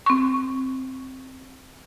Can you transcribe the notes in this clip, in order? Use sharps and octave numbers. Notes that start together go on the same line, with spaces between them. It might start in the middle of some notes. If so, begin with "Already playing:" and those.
C4 C#6